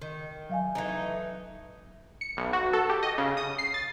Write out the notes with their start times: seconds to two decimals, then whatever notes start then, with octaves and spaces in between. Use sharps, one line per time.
0.02 D#3
0.50 F#3 F5 G#5
0.75 E3 A3 D#4
2.21 C#7
2.37 B1
2.53 F#4
2.73 A4
2.90 G4
3.03 D#5
3.18 C#3
3.37 D#6
3.58 C7
3.74 A6